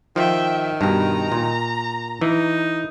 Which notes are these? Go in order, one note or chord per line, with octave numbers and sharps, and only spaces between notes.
D#3 F3 E5 G5
G2 B2 A#5
A#2
E3 D#4